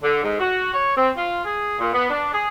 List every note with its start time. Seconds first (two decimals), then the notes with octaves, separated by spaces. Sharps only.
0.02 D3
0.22 G#2
0.39 F#4
0.72 C#5
0.95 C4
1.15 F4
1.44 G#4
1.78 A#2
1.93 B3
2.09 D4
2.32 G#4